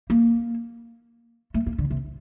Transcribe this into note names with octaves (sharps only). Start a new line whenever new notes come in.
A#3
A3
A#3
D3
C3